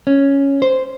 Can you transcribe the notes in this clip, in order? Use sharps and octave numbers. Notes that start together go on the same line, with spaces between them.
C#4
C5